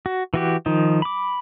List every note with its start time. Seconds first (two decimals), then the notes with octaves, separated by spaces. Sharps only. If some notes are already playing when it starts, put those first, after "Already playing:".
0.06 F#4
0.34 E3 F#4 G4
0.66 D#3 F3 D#4
1.02 B5 D6